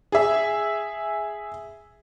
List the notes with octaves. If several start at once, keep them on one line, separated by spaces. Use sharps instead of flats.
G#4 E5